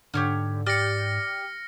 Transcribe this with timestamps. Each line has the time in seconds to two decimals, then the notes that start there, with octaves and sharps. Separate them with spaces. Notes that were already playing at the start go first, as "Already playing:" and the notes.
0.14 G#2 D3 G4 C#5 F6
0.66 G4 D5 F6 A#6 C#7